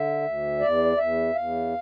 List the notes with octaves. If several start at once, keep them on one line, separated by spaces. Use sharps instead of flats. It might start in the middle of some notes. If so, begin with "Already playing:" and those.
Already playing: D3 E5
D2
E2 D5
E2 E5
E2 F5